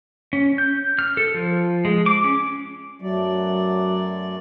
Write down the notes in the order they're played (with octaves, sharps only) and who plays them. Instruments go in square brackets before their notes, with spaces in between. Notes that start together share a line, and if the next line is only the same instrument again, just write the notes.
[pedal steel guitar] C#4
G6
F6
A4
F3
G#3
D6
C#4
[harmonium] F#2 A3 D5 [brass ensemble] F#3